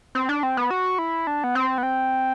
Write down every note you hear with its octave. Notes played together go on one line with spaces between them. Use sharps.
C4
D4
C4
B3
F#4
E4
D4
B3
C4
B3
C4